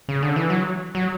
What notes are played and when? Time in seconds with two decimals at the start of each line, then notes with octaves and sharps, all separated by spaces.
0.09 C#3
0.23 D3
0.36 E3
0.50 F#3
0.95 F#3